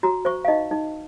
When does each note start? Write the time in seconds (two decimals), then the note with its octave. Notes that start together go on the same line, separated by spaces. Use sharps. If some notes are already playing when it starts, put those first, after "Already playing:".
0.03 F#4 A#5
0.25 C5 C#6
0.45 F5
0.48 D#4 D#5
0.71 D#4